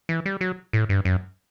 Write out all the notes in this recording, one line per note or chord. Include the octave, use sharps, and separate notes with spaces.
E3
G3
F#3
A2
G2
F#2